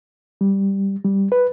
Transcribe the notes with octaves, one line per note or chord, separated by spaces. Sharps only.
G3
G3
B4